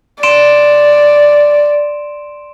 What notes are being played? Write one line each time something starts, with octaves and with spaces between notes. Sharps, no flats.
D5 C6 D7 E7